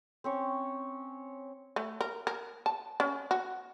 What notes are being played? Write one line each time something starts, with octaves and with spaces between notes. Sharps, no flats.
C4 C#4 C#5
A3
A#4
A#4
A5
C#4
F#4